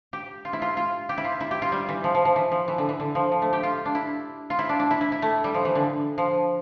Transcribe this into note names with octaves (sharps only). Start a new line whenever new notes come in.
G4
F4
E4
F4
F4
G4
E4
F4
E4
G4
F4
G3
E3
F3
F3
F3
E3
F3
E3
D3
E3
D3
F3
F3
A3
G4
F4
D4
E4
F4
E4
D4
D4
E4
E4
E4
A3
G3
F3
E3
D3
F3